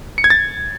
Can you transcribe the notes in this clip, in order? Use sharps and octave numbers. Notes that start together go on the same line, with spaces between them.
C#7
G#6
A6